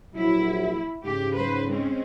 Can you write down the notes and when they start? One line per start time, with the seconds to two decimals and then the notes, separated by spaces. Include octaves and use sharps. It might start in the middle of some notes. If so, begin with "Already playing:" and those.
0.15 A#1 F#3 E4
1.04 G#2 C#3 G4
1.35 F#3 B4 C5
1.68 G#3 C4 C#4